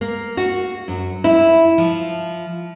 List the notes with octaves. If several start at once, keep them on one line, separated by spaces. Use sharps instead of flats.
A#3
F#4
F#2
E4
F3